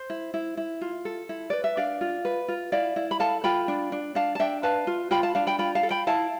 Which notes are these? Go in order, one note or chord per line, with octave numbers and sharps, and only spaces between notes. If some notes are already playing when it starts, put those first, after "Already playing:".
Already playing: C5
E4
E4
E4
F4
A4
E4
B4 D5
E5
D4 D5 F5
F4
B4
F4
E4 D5 F5
E4
B5
A4 F5 A5
F4 G5 B5
D4
D4
D4 F5 A5
A5
D4 E5 G5
B4 F5 A5
F4
F4 G5 B5
F5 A5
D4 F5 A5
G5 B5
F4 G5 B5
F5 A5
A4
G5 B5
E4 F5 A5